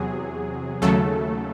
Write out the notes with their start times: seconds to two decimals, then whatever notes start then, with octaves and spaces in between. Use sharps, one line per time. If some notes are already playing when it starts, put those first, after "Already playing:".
Already playing: E2 C3 F#3 G#4
0.82 D#2 C#3 F#3 A3 A4